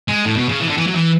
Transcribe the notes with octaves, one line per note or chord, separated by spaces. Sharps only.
G#3
A2
B2
C#3
E3
D3
E3
F#3
E3